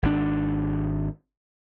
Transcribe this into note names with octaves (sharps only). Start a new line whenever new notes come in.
G#1 B2 D4